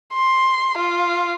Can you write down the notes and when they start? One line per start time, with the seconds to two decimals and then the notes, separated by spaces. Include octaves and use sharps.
0.14 C6
0.78 F4